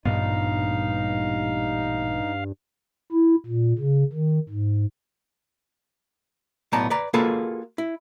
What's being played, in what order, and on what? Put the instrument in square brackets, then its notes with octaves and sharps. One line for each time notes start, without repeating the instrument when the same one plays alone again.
[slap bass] A1 A#2 B3 [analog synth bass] G2 [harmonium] D#4 [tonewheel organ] F5
[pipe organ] E4
A#2
C#3
D#3
G#2
[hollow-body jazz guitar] B1 A2 B3 D5 A5 A#5
B4 D5 A#5
A#3 F4 F#4 G#4 A4 B4
E4